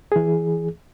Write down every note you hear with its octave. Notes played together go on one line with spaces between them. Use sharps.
E3 G#4